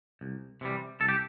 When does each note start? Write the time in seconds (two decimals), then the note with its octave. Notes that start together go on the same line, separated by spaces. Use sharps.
0.21 C2
0.61 C3 E3 G3
1.01 C2 A4
1.08 G4